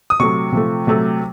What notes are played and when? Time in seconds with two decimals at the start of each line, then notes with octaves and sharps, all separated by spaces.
0.10 D#6
0.20 C3 F#3 A3 C#6
0.52 C3 F3 A3
0.87 C3 F#3 A3